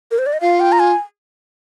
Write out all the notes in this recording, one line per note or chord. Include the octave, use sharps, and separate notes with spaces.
A#4
C5
D5
D#5
F4 F5
G5
A#5
G#5